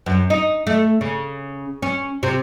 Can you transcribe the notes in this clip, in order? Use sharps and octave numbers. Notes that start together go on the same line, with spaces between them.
F#2
D#4
A3
C#3
C#4
C3